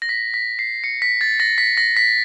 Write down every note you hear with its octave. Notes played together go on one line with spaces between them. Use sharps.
A#6
B6
B6
C7
C#7
B6
A6
A#6
B6
A#6
B6